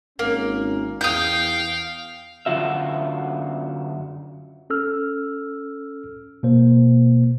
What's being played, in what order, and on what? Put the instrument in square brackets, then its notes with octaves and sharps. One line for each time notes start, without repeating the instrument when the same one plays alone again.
[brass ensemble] G#1 C#4 [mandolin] A#3
[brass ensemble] E2 [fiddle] F5 G5 [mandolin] D#6 G6
[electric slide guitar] F#2 D3 F4 F#4 E5
[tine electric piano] C#4 A4 E6 F6
B2 A#3 C5